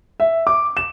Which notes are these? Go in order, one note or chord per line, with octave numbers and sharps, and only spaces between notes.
E5
D6
E7